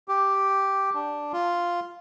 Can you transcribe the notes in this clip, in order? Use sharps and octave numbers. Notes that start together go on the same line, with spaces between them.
G4
D4
F4